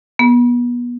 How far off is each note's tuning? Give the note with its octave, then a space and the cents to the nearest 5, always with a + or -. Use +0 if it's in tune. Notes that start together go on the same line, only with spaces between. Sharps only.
B3 -30